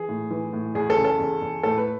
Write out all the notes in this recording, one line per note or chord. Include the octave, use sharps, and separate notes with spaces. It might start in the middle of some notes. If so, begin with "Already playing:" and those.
Already playing: E3 G#4
A2
E3
A2
E2 G#4
A4
C#3
A4
E2
E2
A2 A4
B4